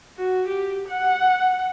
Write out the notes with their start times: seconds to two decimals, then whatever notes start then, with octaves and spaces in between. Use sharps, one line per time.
0.17 F#4
0.48 G4
0.88 F#5